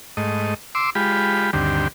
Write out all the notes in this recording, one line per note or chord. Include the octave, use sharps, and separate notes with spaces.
G#2 A3 D#5
C6 D6 E6
G#3 F4 G4 B5
D2 G2 D3 D#3 C4 G4